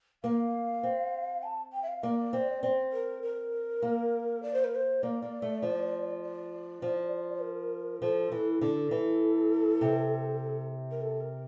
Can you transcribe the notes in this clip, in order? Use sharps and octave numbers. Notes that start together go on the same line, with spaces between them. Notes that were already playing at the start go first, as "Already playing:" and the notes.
A#3 F5
C4
A5
G5
E5
F5
A#3 D5
C4
C4
A#4
A#4
A#3
D5
C5
A#4
C5
A#3 D5
A#3
A3
F3
D5
F3
A#4
F3 A4
E3
D3 A4
E3
C3
A#4
A4
A#4